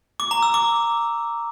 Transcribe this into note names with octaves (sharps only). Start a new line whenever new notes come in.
D6
A#5
E6
D6